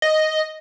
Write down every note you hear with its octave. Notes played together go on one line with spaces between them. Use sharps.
D#5